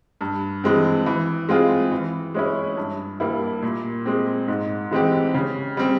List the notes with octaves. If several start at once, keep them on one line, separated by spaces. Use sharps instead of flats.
G2
E3 G#3 C4
E3
G#3 C4 F4 G#4
E3
G#3 C#4 E4
G2
G3 A#3 E4
A#2
G#3 C4
G#2
E3 G#3 C4 G4
C#3
G3 C4